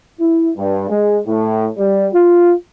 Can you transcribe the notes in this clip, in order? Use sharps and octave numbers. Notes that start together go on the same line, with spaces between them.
E4
G2
G#3
A2
G3
F4